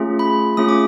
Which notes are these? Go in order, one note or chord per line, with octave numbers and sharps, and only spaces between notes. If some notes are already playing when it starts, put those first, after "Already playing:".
Already playing: A3 C#4 F4 G#4
B5
A3 C#4 F4 G#4 D#6
D6